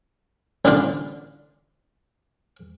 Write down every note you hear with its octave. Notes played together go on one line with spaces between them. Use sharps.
A1 B2 D3 D4 F4